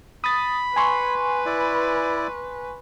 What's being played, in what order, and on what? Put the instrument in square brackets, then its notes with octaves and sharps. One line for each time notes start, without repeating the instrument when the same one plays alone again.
[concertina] B5 [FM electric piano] D#6 A6
[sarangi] B4 [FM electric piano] G#5 C6 C#6
[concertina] E4 D5